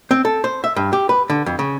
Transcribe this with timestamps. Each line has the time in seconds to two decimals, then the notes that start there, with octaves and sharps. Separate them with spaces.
0.11 C4
0.25 A4
0.44 C5
0.64 E5
0.76 G2
0.93 G4
1.09 B4
1.30 D3
1.46 F2
1.59 C#3